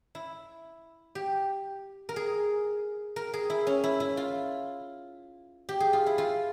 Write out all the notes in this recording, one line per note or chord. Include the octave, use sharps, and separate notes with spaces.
E4
G4
A#4
G#4
A#4
G#4
E4
C#4
E4
E4
F4
G4
G#4
F4
E4
F4